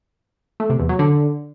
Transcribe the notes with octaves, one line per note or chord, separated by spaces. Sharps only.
A3
C3
E2
F#3
D3